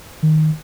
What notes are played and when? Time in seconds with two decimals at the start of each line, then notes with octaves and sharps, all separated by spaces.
0.23 D#3